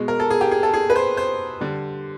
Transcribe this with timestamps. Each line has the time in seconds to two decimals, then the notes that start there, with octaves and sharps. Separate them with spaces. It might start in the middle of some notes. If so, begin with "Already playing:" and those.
Already playing: B2 G#3
0.08 A#4
0.20 A4
0.31 G#4
0.41 G4
0.51 G#4
0.63 A4
0.74 G#4
0.90 B4
0.95 C5
1.17 C5
1.61 D3 G3